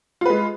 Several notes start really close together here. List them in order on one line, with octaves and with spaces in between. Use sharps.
F4 B4 G#3